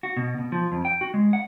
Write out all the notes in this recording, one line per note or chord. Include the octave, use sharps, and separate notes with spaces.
F#4
B2
B2
F3
F2
G5
F#4
G#3
F#5